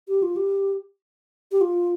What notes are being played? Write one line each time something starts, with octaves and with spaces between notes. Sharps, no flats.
G4
F4
G4
G4
F4